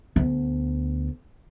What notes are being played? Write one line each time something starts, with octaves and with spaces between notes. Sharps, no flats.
D2 B3